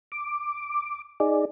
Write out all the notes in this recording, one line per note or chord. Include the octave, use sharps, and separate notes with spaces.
D6
D#4 G#4 D5